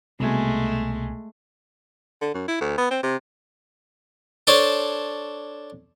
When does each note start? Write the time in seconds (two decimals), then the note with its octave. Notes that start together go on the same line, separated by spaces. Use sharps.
0.20 C2 B2 G#3 A3 G#5
2.22 D3
2.34 F#2
2.48 E4
2.61 D2
2.78 B3
2.91 C4
3.03 C3
4.47 D4 A4 C5 C#5